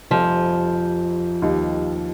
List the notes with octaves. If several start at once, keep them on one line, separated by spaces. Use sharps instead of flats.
F1 F2 C3 F3 G3 C4
D#2 D#3 G3